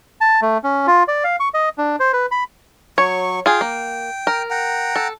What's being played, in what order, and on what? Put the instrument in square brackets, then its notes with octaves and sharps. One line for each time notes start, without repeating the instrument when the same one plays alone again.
[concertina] A5
A3
C#4
F4
D5
F5
C#6
D#5
D4
C5
B4
B5
[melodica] F#3 C#6 [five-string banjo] C#5
[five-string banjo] F4 G#4 [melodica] G5
[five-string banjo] A#3
A#4
[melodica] F#5 G5 A#5
[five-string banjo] A4